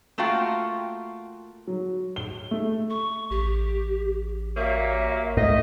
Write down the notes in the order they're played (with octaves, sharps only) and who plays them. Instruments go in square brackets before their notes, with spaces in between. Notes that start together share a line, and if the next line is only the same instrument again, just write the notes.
[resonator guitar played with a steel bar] A3 A#3 F4 F#4 F5 G5
[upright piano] F#3
G7
A3
[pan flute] C#6
[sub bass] A1 [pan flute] G4
[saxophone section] F#3 G3 A#3 [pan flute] E5
[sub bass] C#2 [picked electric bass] G#2 A3 [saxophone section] D#5 [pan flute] E5